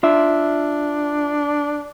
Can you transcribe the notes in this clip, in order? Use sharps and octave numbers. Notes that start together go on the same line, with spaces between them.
D4 F4 E5